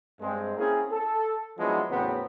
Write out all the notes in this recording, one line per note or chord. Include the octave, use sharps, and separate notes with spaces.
G2 G#3 C4
A#3 C4 C#4 E4 G#4
A4
F3 F#3 G#3 B3 D4 E4
E2 A2 C#3 F#3 B3 C4